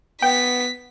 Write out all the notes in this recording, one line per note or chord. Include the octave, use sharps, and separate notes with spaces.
B3 G5 B6